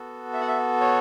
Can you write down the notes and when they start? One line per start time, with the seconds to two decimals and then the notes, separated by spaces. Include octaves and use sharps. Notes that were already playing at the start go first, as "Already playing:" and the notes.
Already playing: B3 F#4 A4
0.33 E5
0.40 F#5
0.48 E5
0.81 C#5